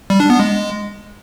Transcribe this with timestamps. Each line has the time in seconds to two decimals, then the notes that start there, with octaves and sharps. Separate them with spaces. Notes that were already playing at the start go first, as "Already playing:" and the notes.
0.10 G3
0.20 D4
0.30 B3
0.40 G#3